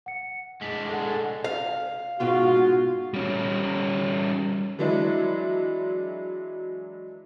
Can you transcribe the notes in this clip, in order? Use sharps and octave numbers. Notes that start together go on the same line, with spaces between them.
F#5 C#7
G#3 D4 B6
A4 F#5
F5
G#2 B2 G#3 F4 F#4
G3 C#4
E3 F#3 G#3 D4 E4